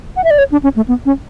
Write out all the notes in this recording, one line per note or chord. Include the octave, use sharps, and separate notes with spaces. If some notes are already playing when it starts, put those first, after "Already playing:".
F#5
E5
D5
C#5
D4
C#4
A3
B3
C#4